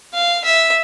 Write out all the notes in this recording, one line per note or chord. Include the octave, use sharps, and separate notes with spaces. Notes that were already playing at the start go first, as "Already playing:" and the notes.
F5
E5